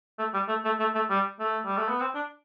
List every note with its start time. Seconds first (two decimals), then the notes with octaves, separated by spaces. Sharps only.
0.18 A3
0.34 G3
0.48 A3
0.65 A3
0.79 A3
0.94 A3
1.10 G3
1.40 A3
1.65 G3
1.77 A3
1.88 B3
2.00 C4
2.15 D4